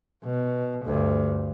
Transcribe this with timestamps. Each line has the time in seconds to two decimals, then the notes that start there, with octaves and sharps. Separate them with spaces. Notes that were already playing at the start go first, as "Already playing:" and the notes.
0.24 B2
0.85 D2 G2